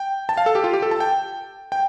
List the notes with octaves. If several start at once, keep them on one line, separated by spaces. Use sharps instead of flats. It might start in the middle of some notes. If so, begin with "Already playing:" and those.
Already playing: G5
A5
F5
A4
G4
F4
G4
A4
A5
G5
G5